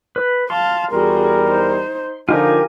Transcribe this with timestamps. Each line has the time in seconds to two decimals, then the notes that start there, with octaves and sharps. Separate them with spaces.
0.16 B4
0.50 F5 A5 C6
0.92 E2 G3 F#4 G#4 A#4
1.47 D#4 C5
2.29 D3 F3 D#4 F4 G4 A#4 G#5